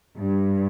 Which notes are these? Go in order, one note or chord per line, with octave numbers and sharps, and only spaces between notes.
G2